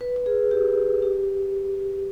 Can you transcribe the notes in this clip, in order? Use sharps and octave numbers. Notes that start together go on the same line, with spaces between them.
B4
B4
G#4
G4
G4